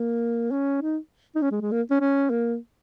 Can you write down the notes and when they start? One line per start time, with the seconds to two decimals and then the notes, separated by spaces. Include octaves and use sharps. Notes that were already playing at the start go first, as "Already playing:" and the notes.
Already playing: A#3
0.51 C#4
0.82 D#4
1.35 D#4
1.42 C#4
1.51 G#3
1.61 G#3
1.71 A#3
1.90 C#4
2.00 C#4
2.30 A#3